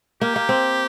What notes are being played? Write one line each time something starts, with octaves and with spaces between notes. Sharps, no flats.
A#3 G4
A#3
C4